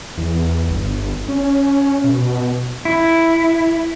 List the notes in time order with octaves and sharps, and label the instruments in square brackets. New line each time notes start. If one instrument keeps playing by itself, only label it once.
[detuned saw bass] E2
G1
C#4
B2
[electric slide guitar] E4